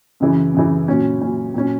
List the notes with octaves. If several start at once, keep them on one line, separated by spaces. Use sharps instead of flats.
F#2 C#3 E3
F#2 C#3 E3
A#2 F#3 C#4
A#2 F#3 C#4
A#2 F#3 C#4